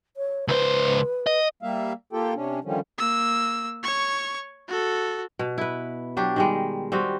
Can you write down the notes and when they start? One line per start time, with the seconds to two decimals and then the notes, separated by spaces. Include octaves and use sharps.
0.17 C#5
0.48 C#2 B4 C5
1.27 D#5
1.62 G3 A#3 E5 F5
2.13 A#3 F4 G4 A4 G5
2.35 C3 C#4 D4
2.64 D3 D#3 F3 G3 C#4
2.98 A#3 E6
3.83 C#5 C#6
4.68 F#4 A4
5.39 B2
5.58 E4 B4
6.17 F#3 D4 G4
6.36 D#3 G3 G#3
6.92 G3 C4 F#4